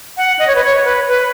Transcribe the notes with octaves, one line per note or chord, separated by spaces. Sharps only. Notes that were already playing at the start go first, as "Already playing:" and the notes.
F#5
D#5
C#5
B4
C#5
B4
B4